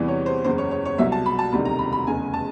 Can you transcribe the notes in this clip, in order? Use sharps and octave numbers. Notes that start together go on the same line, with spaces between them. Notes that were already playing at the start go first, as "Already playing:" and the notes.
Already playing: E2 C3 E3 G3
C#5
C5
F#1 E2 C#3 C5
C#5
C#5
C#5
C2 B2 F#3 E5
A5
B5
A5
E1 D2 C3 D#3 G3 B5
A#5
B5
B5
F1 E2 C#3 G#5
A5